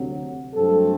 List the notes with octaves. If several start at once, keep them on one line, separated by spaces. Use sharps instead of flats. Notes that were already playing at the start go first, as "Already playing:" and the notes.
Already playing: D2 C3 F#3
G2 F#3 A3 C4 A4